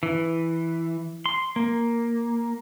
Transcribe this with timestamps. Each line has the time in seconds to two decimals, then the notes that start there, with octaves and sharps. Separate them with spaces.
0.03 E3
1.26 C6
1.56 A#3